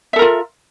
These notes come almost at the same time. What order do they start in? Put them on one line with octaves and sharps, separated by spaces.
E5 A4 A#4 F4